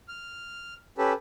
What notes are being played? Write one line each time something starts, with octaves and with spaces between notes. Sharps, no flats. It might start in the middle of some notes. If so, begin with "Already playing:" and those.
F6
C#4 G4 A4 B4